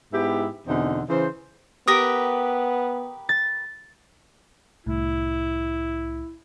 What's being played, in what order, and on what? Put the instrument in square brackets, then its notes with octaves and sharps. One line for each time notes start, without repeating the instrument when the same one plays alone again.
[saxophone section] G#2 B3 E4 G4
E2 B2 D3 C4 D#4
C#3 E3 C5
[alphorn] B3 [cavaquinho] G4 A#4 B4 [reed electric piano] D#6
[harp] A6
[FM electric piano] C2 A2 [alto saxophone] E4